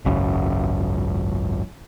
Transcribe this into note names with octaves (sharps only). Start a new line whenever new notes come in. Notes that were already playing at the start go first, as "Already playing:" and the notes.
G#1 C#2 F#2